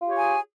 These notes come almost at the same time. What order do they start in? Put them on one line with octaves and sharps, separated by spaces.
F4 G4 C#5 G#5 G#4